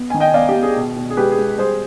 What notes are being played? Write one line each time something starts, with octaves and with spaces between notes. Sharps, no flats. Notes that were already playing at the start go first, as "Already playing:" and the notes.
Already playing: B3
D#3 G#5
D#5 G5
B3 D5 F5
G4
B3
G#4
B2
B2
G#4
G#3 G4 B4
G#4
G#3
G3 G#4 C5